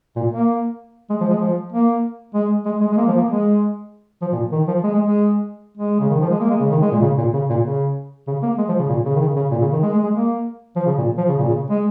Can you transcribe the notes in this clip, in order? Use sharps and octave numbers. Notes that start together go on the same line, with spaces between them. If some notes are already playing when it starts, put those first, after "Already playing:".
A#2
A#3
G#3
F3
G#3
F3
A#3
G#3
G#3
G#3
G#3
A#3
F3
A#3
G#3
F3
A#2
D#3
F3
G#3
G#3
G#3
G#3
C#3
D#3
F3
G#3
A#3
G#3
C#3
D#3
G#3
A#2
C#3
A#2
C#3
A#2
C#3
C#3
A#3
G#3
F3
C#3
A#2
C#3
D#3
C#3
C#3
A#2
C#3
D#3
G#3
G#3
G#3
A#3
F3
C#3
A#2
F3
C#3
A#2
C#3
G#3